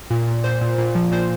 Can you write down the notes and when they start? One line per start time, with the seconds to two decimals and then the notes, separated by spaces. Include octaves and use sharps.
0.10 A#2
0.27 A#2
0.44 A#2 C5
0.61 A#2
0.78 A#2
0.95 F3
1.12 A#2 C5